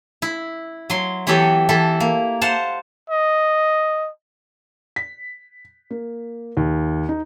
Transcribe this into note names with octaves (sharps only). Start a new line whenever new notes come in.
E4
F#3 C6
E3 F#3 B3 G4 A4 C#5
E3 E4 A4
A#3
C5 F5 F#5 A5
D#5
B6
A#3
D#2
D#4